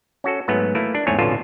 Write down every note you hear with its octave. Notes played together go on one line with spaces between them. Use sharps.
C#4 F#4 A4
G#2 F#3 A3 B3
E3 A3 A#3 E4
D4
E2 G#2 A3 C4 C#5 G#5
A1 F2 B2 D3 F4 A5